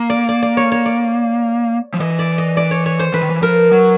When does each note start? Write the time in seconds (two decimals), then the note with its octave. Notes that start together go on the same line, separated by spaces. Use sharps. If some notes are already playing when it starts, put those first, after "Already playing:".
Already playing: A#3
0.10 D5
0.29 D5
0.42 D5
0.57 C#5
0.72 C#5
0.86 D5
1.94 F3
2.00 E3 D#5
2.19 D5
2.38 D#5
2.57 D5
2.71 C#5
2.86 C#5
2.99 C5
3.14 E3 B4
3.22 D#3
3.30 E3
3.42 F3 A#4
3.72 F#3